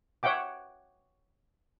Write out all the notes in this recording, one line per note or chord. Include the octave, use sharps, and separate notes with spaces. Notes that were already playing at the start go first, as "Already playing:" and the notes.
C#5 E5 F#5 G5 D6